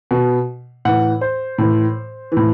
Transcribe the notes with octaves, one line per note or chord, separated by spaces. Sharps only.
B2
A2 E3 F#5
C5
A2 E3
A2 E3